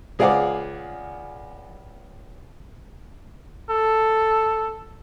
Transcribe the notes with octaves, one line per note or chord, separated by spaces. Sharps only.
C#2 G#4 D5 F5 F#5 D6
A4